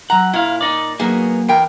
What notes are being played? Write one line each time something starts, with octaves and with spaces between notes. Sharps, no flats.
F#3 F#5 A#5
A#2 E4 F5
D#4 D5
F#3 A#3 B3 D#4 G#4
E2 A#4 G5